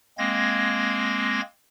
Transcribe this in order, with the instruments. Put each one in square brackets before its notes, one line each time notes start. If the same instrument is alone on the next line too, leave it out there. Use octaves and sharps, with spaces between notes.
[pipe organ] G#3 A#3 C4 G#6 A#6